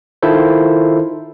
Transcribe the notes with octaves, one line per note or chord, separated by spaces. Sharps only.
D#3 E4 F4 A4 C5